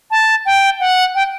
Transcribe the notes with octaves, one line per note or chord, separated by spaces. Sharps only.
A5
G5
F#5
G5